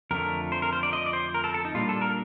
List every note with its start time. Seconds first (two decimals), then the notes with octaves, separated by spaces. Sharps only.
0.11 F2 D3 F3 A3 A#4
0.52 C5
0.62 A#4
0.73 C5
0.83 D5
0.93 D#5
1.06 D5
1.13 C5
1.34 A#4
1.44 A4
1.54 A4
1.65 D#4
1.74 A#2 G3 A#3 D4 F4
1.89 A4
2.01 A#4